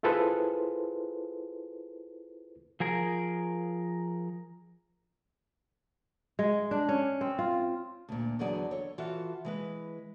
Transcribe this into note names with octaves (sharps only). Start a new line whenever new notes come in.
E4 F4 G#4 A4 B4 C5
F3 G#4 A#4
G#3
D4
C#4
C4
F4
D2 A#2
E2 D3 F#3 B3 G#4 D5
A4 C#5
E3 F4 F#4 A4 E5
E3 G#3 B4